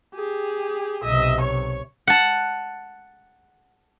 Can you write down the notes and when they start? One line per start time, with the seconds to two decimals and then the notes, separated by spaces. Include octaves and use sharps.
0.14 G4 G#4
1.04 B1 C3 D#5 E5
1.41 C#5 C#6
2.07 F#5 A5